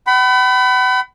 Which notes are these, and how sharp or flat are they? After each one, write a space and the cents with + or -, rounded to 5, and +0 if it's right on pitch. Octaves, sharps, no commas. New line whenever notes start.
F#5 +45 B5 +20